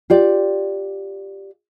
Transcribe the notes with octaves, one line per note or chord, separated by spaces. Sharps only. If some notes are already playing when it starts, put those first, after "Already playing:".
F4 G4 D5